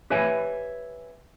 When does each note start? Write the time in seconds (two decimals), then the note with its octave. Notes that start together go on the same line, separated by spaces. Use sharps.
0.10 G4 B4 C#5 E5 G#5